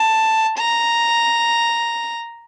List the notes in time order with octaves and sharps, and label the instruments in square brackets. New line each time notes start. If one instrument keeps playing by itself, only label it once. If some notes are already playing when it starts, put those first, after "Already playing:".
Already playing: [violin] A5
A#5